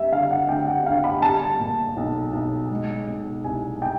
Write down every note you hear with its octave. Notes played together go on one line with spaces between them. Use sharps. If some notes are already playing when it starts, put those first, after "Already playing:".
Already playing: G3 E5
D3 F5
F#5
D2 G5
F#5
D2 F5
B5
G3 A5
A#2
B1
B1
G#3
B2
C2 G#5
G5